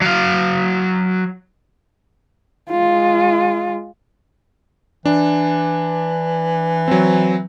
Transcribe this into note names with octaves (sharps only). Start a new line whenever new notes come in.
F#3 F5
G#3 F4
E3 D4
F#3 C4